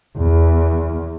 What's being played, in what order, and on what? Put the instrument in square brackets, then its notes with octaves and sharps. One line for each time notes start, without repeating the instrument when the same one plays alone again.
[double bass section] E2